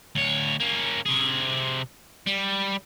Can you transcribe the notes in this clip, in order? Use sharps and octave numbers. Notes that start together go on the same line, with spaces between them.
D2 C#5
A#3 C#4
C3 G#4
G3